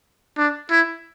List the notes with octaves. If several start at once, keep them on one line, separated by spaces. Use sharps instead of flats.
D4
E4